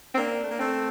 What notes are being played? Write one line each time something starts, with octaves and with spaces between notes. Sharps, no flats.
C4
A#3 D4
A3
A#3
A3 C4